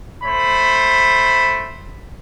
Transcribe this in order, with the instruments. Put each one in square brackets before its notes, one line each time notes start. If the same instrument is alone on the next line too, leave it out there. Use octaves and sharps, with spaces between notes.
[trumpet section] A3 C5 B5